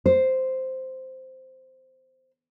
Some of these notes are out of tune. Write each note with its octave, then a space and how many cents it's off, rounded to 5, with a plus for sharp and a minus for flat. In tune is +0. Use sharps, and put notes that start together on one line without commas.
C5 -5